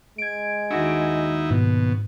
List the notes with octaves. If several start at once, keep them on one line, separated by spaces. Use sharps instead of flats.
G#3 G#6 D7
D#2 D#4 E4 F#4
G#2 B2